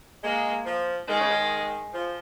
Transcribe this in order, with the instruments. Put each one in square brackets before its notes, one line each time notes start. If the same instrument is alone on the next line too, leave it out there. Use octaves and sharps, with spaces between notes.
[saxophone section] G#3 [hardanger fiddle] A#3
[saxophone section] F3
[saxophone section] D#3 [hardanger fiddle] G#3
[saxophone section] C#3
D#3
F3